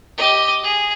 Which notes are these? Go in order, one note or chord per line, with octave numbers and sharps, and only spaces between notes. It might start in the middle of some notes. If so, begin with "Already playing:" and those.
G4 D#5
G#4